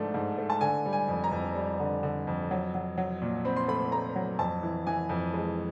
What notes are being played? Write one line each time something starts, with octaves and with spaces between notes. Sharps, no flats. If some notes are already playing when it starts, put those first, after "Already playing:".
Already playing: G#2 F3 A3 D4
G#2
A3
A5
D3 G#5
G3
G#5
F2
A#5
F2
G3
D3
D3
F2
F#3
F#3
F#3
A#2
C4 B5
C6
A3 B5
A3 A#5
F#3
F2 A5
E3
E3 G#5
F2
G#3